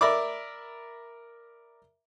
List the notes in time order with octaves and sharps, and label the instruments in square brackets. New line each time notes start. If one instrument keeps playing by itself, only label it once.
[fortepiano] A#4 D5 E5 B5 D6